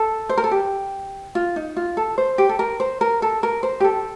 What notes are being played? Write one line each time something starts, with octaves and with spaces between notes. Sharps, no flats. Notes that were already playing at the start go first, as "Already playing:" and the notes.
Already playing: A4
C5
A#4
A4
G4
F4
D#4
F4
A4
C5
G4
A4
A#4
C5
A#4
A4
A#4
C5
G4
A4